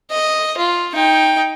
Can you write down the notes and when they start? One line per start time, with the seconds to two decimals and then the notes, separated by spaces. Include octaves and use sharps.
0.11 D#5
0.57 F4
0.95 D#4 G5